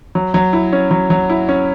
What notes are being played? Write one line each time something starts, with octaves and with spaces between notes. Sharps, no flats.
F#3
F#3
E4
C#4
F#3
F#3
E4
C#4